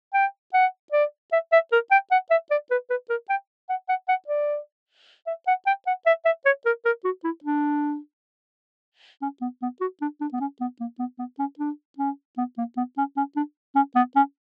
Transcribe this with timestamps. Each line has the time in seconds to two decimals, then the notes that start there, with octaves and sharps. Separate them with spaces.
0.14 G5
0.54 F#5
0.92 D5
1.32 E5
1.52 E5
1.72 A#4
1.91 G5
2.11 F#5
2.30 E5
2.51 D5
2.71 B4
2.90 B4
3.10 A#4
3.30 G5
3.69 F#5
3.89 F#5
4.08 F#5
4.28 D5
5.27 E5
5.47 F#5
5.67 G5
5.87 F#5
6.06 E5
6.25 E5
6.45 C#5
6.65 A#4
6.85 A#4
7.04 F#4
7.24 E4
7.44 D4
9.22 C#4
9.41 B3
9.62 B3
9.81 F#4
10.01 D4
10.21 D4
10.33 B3
10.40 C#4
10.61 B3
10.80 A#3
10.99 B3
11.19 B3
11.39 C#4
11.59 D4
11.98 C#4
12.37 B3
12.58 A#3
12.77 B3
12.98 C#4
13.17 C#4
13.36 D4
13.75 C#4
13.96 B3
14.16 C#4